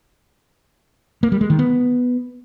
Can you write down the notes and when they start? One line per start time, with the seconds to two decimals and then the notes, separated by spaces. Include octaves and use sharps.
1.23 A#3
1.32 G3
1.41 G#3
1.50 D#3
1.59 B3